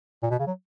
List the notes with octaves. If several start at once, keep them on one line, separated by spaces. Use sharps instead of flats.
A#2
B2
C#3
F#3